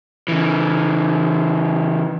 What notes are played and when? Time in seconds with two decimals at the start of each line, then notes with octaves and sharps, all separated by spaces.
0.28 C#3 E3